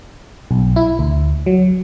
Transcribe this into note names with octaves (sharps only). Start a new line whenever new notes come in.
B1
E4
D2
F#3